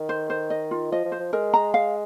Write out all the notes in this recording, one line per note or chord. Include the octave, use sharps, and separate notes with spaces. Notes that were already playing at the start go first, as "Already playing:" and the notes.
Already playing: D#3
C5
C5
D#5
F4
F3 D#5
F3
C5
F3
G#3 A#4
A#5
F5